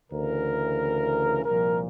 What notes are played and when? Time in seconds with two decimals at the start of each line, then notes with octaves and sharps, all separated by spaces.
0.11 D2 C#3 E3 A#4
1.44 C2 A#2 F3 A#4